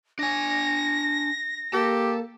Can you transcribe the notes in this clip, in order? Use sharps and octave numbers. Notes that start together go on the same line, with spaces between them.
D4 G#5 A#6
A#3 G4 A4